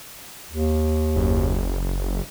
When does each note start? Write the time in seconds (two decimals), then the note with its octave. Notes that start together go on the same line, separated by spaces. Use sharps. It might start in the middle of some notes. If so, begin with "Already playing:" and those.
0.52 D#2
1.16 F#1